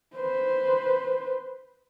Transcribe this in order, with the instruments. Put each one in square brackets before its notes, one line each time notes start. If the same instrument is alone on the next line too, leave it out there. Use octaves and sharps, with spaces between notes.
[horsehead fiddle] B4 C5